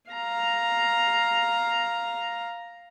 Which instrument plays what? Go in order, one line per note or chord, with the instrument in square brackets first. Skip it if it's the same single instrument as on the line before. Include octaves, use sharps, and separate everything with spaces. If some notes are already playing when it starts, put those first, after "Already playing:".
[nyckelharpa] F5 A#5